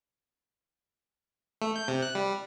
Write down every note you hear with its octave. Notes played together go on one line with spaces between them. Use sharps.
A3
G6
C3
F#6
G3